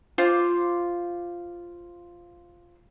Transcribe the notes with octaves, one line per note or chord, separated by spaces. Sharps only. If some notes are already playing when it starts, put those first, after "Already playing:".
F4 C5 D6